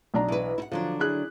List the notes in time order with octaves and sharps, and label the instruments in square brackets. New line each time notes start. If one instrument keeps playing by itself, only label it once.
[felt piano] B1 D4 A#5
[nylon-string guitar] E3 B4
E4 F#5
[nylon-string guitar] D3 F#3 D4 [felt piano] F3
[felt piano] E4 G#4 F#6